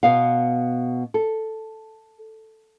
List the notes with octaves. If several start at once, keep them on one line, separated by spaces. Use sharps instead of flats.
B2 B3 F5
A4